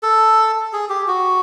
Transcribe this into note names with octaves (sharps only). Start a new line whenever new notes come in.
A4
G#4
G4
F#4